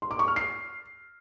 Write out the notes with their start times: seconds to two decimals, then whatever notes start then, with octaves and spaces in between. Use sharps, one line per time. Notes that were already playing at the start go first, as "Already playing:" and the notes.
0.02 C6
0.11 D6
0.19 C#6
0.28 F6
0.36 C7